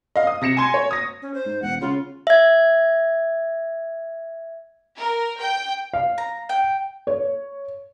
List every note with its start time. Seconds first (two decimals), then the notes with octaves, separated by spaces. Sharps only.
0.16 D#5 F5
0.27 D#6
0.41 C3 A#6 C#7 E7
0.57 G#5 C6 G#6
0.74 C#5
0.91 D#6 A#6
1.22 C#4
1.34 C5
1.46 G#2
1.62 E1 F#5
1.81 C#3 F4
2.27 E5 G#6
4.98 A#4
5.38 G5
5.94 F5
6.18 A#5
6.49 G5
7.07 C#5